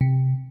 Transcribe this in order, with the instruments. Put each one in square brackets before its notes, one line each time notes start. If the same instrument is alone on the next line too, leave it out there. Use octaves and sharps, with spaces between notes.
[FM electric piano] C3